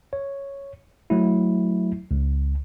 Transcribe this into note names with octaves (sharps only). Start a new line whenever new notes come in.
C#5
F#3 A3 E4
C#2